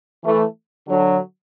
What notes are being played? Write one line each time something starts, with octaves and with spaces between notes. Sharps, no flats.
E3 A3
D3 F#3